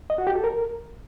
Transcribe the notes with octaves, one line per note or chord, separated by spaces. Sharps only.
D#5
F#4
G4
A4
A#4